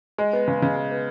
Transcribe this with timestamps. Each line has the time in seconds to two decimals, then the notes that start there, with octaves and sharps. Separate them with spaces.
0.18 G#3
0.33 B3
0.48 C#3
0.62 C#3
0.76 G#3
0.91 B3